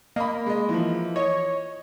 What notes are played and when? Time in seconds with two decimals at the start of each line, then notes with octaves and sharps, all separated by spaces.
0.16 A#3 D#5 B5
0.46 G#3 D#5
0.69 E3 F3
1.16 C#5 D#5